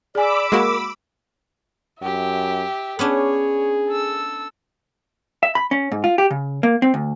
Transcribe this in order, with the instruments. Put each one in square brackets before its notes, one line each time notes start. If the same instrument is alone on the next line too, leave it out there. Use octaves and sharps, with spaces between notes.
[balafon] G#4 G#5 [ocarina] D5 [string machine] B5 D6 E6
[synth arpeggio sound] G#3 A#3 F#4 [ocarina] A#4
[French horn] F#2 [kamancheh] G4 E5
[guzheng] B3 C#4 D4 [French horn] G#4 [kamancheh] C#5
[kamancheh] A4 E6
[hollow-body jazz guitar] E5
B5
C#4
G#2
F4
G4
C#3
A#3
C4
D2